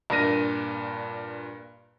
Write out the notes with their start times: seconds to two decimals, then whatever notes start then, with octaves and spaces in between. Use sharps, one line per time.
0.10 G2 A#2 A#4 A#6 D#7